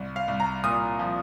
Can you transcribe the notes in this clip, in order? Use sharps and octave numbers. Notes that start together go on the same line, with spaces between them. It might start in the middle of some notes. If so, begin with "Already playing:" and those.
Already playing: C2
F5
C2
A#5
A#2 D#6
F3